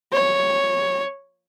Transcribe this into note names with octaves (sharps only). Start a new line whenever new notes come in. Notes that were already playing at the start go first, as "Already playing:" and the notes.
C#5